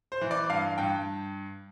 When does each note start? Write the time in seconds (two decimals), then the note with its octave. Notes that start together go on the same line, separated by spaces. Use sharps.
0.12 C5
0.21 E3
0.31 D5
0.50 G2 F5
0.78 G2 G5